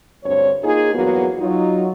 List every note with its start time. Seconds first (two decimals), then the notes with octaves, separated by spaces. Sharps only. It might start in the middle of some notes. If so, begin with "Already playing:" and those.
0.24 D2 G2 C4 C#5
0.63 A#3 D#4 F4 G#4
0.94 E2 G2 F#3 A#3 B3 F#4
1.38 F#3 D#4 F4